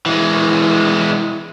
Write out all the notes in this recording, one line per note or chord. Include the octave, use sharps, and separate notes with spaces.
E3 G#3